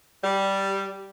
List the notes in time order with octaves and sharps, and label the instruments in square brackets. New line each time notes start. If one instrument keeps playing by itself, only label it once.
[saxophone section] G3